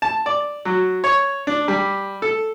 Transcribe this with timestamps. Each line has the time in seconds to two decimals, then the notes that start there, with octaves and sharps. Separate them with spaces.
0.02 A5
0.26 D5
0.65 F#3
1.04 C#5
1.47 D4
1.68 G3
2.22 A4